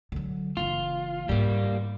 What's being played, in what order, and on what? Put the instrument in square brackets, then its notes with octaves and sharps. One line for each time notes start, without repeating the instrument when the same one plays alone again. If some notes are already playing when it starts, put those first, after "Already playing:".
[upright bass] D3 F#3
[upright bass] F#1 E3 [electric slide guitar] F4
[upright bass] G#2 E4 [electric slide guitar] G3 A#3